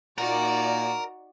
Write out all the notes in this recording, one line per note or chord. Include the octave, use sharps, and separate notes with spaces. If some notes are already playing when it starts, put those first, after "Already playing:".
A#2 D#4 F#4 A#4 D5